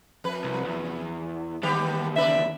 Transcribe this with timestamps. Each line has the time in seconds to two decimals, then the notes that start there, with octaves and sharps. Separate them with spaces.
0.24 F2 B4
0.44 C2
0.66 E2
1.63 E2 D#3 G3 B3 G4
2.16 C#3 B4 D5 E5